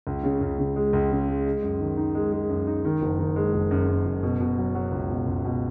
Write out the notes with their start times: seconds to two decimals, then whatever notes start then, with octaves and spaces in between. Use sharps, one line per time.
0.07 C#2
0.23 C#3
0.41 C#2
0.58 C#3
0.76 G#3
0.93 C#2
1.11 C#3
1.28 G#3
1.46 G#3
1.62 F#2
1.80 D#3
1.97 D#4
2.15 G#3
2.32 G#3
2.49 F#2
2.67 D#4
2.85 D#3
3.01 F#1
3.19 D#3
3.36 G#3
3.54 F#1
3.71 F#2
3.88 F#2
4.05 F#1
4.23 B2
4.40 B2
4.58 F#3
4.75 F#3
4.92 C#2
5.10 B2
5.27 C#2
5.44 B2